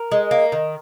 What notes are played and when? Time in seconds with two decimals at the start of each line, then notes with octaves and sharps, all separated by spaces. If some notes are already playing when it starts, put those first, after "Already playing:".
Already playing: A#4
0.12 G#3
0.31 A#3
0.52 D#3